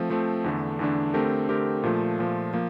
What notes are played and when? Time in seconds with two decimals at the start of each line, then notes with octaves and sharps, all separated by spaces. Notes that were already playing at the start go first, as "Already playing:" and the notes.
Already playing: F3 A3 C4
0.10 F3 A3 C4
0.44 E2 D3 A3 D4
0.79 E2 D3 A3 D4
1.14 D3 A3 C4 G4 A#4
1.49 D3 A3 C4 G4 A#4
1.84 A#2 F3 A3
2.19 A#2 F3 A3
2.53 F3 A#3